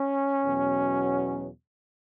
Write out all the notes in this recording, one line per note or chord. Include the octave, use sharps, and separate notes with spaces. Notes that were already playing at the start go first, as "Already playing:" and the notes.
Already playing: C#4
E2 B2 F#3